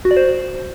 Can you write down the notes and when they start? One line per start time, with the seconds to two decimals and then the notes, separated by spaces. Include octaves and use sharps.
0.05 F#4
0.11 D5
0.17 C5